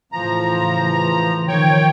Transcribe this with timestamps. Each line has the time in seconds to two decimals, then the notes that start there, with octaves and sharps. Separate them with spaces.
0.12 A2 C#3 E3 F3 A#5
1.48 D#3 F3 C#5 G5